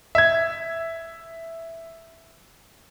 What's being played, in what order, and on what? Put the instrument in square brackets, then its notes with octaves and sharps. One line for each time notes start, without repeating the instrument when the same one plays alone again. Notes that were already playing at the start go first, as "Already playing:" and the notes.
[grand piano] E5 G#6